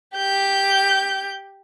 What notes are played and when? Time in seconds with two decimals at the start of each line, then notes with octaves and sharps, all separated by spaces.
0.17 G4 G6